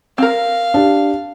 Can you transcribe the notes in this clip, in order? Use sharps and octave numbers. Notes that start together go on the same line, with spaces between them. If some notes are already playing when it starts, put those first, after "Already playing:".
C4 A#4 F5
D4 G4